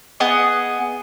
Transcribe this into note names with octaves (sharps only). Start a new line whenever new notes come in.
B3 G#4 D#5